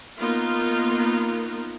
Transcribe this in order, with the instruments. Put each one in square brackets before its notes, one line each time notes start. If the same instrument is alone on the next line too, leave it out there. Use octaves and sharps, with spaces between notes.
[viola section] A#3 B3 D#4 F4